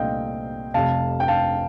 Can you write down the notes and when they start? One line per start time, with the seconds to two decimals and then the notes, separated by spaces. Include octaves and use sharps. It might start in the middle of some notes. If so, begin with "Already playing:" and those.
Already playing: C2 A#2 A3 C4 D#5 F5 G5
0.74 F1 F2 C3 F5 A5
1.20 G5
1.28 F5 A5